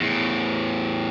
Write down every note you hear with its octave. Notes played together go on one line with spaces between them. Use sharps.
E2 A2